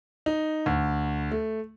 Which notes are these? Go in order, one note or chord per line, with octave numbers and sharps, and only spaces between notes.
D#4
D2
A3